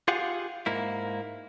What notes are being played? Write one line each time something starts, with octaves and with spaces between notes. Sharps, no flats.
F4 G4 G#4 F5 F#5
G#2 A#3 E4